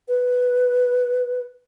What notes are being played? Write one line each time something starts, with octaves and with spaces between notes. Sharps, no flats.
B4